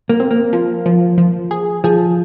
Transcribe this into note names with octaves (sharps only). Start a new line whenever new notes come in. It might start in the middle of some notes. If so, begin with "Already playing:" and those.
A#3
C4
A#3
F3
F3
F3
G#4
F3 G#4